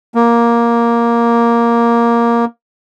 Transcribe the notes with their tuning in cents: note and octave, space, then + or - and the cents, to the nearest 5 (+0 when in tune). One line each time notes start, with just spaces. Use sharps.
A#3 +5